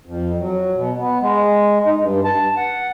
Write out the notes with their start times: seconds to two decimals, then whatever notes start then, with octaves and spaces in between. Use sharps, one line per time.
0.06 F2
0.40 F#3
0.75 B2
0.98 B3
1.21 G#3
1.86 D#4
2.00 G2
2.24 A5
2.57 F#5